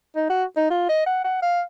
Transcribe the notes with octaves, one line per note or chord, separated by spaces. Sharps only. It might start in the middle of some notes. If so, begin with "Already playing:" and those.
D#4
F#4
D#4
F4
D#5
F#5
F#5
F5